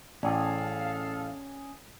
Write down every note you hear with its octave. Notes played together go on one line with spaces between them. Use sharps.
A1 C#4 G#4 A4 D5 F5 G5 A5